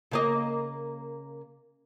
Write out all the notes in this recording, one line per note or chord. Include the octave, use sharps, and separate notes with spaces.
C#3 A#3 D#5